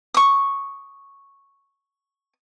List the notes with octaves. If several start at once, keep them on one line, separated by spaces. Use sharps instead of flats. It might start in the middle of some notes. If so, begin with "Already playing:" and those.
C#6 D#6